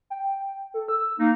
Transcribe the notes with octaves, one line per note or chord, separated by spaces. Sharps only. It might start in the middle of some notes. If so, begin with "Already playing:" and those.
G5
A4
E6
A#3 D#4 A#5